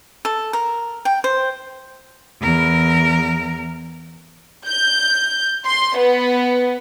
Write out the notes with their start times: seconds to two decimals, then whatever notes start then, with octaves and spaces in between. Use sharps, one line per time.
0.25 A4
0.53 A#4
1.05 G5
1.24 C5
2.40 E2 A#4
4.67 G6
5.66 C6
5.98 B3